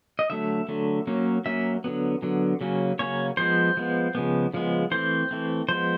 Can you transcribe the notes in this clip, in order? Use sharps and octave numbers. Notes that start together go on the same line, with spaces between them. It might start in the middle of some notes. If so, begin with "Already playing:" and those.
D#5
D3 F#3 A3 E5
D3 F#3 A3
F#3 A#3 C#4
F#3 A#3 C#4 E5
D3 F#3 B3
D3 F#3 B3
C#3 F#3 A#3 C#4
C#3 F#3 A#3 C#4 C#5
F3 G#3 B3 C5
F3 G#3 B3
C#3 F3 G#3 B3
C#3 F3 G#3 B3
E3 A3 C4 C5
E3 A3 C4
F3 G#3 B3 C5